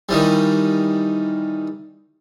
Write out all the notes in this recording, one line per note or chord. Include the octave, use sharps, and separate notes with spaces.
D#3 E3 G3